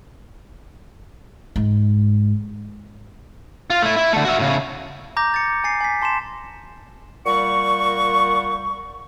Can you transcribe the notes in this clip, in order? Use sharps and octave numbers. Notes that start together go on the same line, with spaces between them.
G#2
F4
A3 E4
E4
D3 A3
F#4 E5
A2 C#3
A#5 D6 G6 A#6
A6 C#7
G#5 A6 C7
G#5 B6
A5 C6 B6 E7
A#2 G3 F#5 C#6